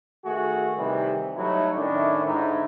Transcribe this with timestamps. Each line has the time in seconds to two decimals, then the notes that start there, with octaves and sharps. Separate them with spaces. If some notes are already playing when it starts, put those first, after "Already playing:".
0.25 D#3 A3 F#4 G#4
0.77 C3 D#3 E3 G3
1.36 F#3 G3 A3 D#4 E4
1.76 A2 D#3 C#4 D4 E4
2.24 G#2 D3 D#4 E4